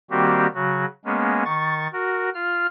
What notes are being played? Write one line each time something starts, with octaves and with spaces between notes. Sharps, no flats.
D#3 G3 A#3 C4 F#4 G4
C#3 F#3 F#4
G#3 A#3 B3 C#4
D#3 C#6 A6
F#4 A#4
F4 F6